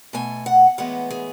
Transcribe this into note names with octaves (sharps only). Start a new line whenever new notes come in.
B2 A3 G#5
F#5
A2 E3 G#3 B3 F#5
G#4